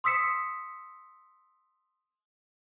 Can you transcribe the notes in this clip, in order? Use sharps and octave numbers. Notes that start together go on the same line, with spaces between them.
C6 D#6 E6 B6 C#7 E7